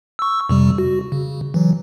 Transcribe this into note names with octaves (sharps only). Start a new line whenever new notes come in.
C#6 E6
F2 C3 G3
F#4
C#3
E3 F#3